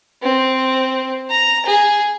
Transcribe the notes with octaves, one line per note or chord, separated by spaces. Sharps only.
C4
A#5
G#4